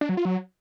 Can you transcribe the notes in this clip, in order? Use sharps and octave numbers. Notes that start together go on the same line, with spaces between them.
D4
F#3
F4
F#3